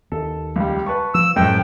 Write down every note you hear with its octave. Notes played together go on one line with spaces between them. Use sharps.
D#2 A4
C#2 G3
B4 A5 C#6
F3 E6
F#2 A2 F3 F#3 G#3 G5